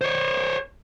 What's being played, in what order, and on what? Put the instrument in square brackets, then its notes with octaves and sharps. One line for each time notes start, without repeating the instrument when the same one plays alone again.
[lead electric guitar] C5 C#5